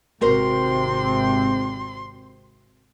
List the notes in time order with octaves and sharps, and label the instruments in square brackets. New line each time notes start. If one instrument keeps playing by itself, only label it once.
[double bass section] G#1 C3 C4 [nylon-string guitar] F#4 A#4 C5 [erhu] C6